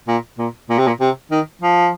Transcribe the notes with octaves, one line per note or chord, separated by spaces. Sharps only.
A#2
A#2
A#2
C3
A#2
C3
D#3
F3